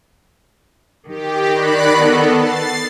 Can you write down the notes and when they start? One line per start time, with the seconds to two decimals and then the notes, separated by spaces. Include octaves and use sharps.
1.08 D#3 G4
1.51 D5 B5 F#6
1.92 B3 A4
2.35 A6 C7